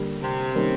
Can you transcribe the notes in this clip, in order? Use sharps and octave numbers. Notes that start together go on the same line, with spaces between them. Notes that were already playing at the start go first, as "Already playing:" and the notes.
Already playing: D3 G3 A#3
C3
D#3 G3 A#3 C#4